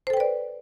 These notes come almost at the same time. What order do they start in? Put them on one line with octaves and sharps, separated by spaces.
C5 A4 G5 B4 D5